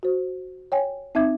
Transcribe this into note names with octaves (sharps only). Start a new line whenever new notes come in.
F#4 C5
C#5 G5 G#5
C4 D#4 E5 D6 G#6